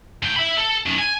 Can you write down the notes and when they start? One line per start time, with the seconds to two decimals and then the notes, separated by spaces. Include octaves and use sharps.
0.23 G#2 G5
0.36 E5 B5
0.57 A4
0.86 F#2 D#3
0.98 G#5